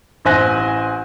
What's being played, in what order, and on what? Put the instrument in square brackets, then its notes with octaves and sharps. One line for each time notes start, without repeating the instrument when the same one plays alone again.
[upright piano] A1 E4 C5 G#5 F#6 A#6